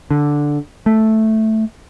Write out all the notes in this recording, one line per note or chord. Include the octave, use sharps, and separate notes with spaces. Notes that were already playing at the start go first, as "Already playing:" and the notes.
D3
A3